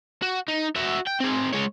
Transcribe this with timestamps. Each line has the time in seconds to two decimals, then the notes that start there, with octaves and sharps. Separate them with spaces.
0.22 F#4
0.48 D#4
0.76 F#4 E5
1.07 G5
1.21 C4 G#4
1.53 G#3 C#5